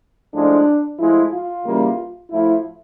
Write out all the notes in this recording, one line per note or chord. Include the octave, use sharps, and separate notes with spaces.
A2 F3 G#3 D4
A2 F3 G#3 E4
F4
C#3 E3 G3 A#3
A2 F3 A3 E4